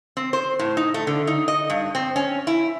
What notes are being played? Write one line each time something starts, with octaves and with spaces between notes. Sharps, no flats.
C4
C5
A2
D#4
A3
D3
D#4
D#5
G2
C4
C#4
E4